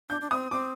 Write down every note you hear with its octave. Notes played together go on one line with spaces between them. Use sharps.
D4 G6
D4
C4 D#6
C4 D6